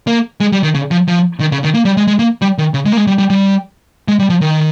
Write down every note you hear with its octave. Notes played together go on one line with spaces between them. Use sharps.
A#3
G#3
G3
D#3
C#3
F3
F3
D#3
C#3
D#3
A#3
G3
G#3
G#3
A#3
G3
D#3
C#3
G#3
A#3
G#3
G3
G3
G3
G#3
G3
F3
D#3